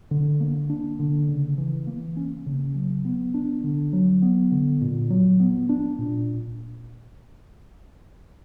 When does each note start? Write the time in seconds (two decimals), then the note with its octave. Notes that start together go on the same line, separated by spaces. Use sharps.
0.11 D3
0.40 A#3
0.70 D4
0.99 D3
1.29 C#3
1.58 E3
1.87 A#3
2.17 C#4
2.46 C#3
2.75 F#3
3.05 B3
3.34 D4
3.64 D3
3.93 F#3
4.22 B3
4.52 D3
4.81 A#2
5.10 F#3
5.40 B3
5.69 D4
5.98 A#2